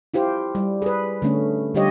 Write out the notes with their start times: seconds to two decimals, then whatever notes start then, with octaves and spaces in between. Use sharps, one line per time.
0.14 E4 F4 G4 C5
0.55 G3
0.82 G#4 B4
1.22 D3 A3 C#4
1.75 D3 G3 F4 G4 C#5 D#5